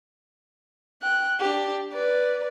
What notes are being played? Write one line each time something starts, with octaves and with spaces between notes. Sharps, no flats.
G5 F#6
D4 G4
B4 D5